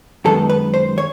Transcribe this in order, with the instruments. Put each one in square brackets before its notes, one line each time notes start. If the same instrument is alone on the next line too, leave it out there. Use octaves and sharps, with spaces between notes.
[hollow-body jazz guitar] F#2 D#3 G#3 B3 A4
B4
C5
C#5